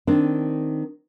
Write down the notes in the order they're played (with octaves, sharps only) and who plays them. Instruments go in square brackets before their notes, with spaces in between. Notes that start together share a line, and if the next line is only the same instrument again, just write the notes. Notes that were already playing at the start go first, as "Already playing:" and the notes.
[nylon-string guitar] D#3 C4 D4